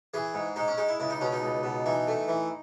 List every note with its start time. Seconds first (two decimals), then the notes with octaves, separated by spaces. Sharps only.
0.14 E3 G#4
0.34 G#2
0.56 G#3 D#4
0.68 C#4
0.77 G#3 D#4
0.88 E4
1.00 C#2 E4
1.10 D#4
1.21 B2 C#4
1.32 D#4
1.43 C#2
1.63 B2
1.86 E3 D#4
2.08 A3
2.28 E3